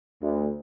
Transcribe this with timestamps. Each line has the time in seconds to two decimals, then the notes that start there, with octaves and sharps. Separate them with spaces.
0.22 D2